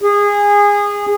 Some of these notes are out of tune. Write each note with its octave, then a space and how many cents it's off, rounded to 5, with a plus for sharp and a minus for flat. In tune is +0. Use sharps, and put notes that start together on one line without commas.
G#4 -20